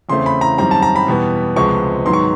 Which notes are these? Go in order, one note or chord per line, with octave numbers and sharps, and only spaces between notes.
E2 C#3 E3 A3 C4 C6
B5
A#5
F#2 D#3 G3 C4 A#5
A5
A#5
B5
E2 B2 G3 B3
C#2 C3 F3 G#3 B3 C#6
G#2 D#3 F#3 B3 C6
C#6